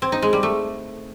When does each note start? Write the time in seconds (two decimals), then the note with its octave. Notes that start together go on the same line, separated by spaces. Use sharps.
0.02 C4
0.12 D#4
0.22 G#3
0.33 G3
0.43 A3